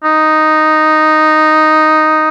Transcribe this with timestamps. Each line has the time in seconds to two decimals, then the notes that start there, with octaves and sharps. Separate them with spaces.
0.04 D#4